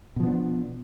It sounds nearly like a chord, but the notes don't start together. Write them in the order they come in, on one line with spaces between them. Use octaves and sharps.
B2 F3 B3 D4